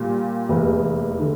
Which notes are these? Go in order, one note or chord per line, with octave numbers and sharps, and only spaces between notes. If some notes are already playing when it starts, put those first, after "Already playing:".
Already playing: A#2 G3 A#3
F1 E2 E3 A#3
D3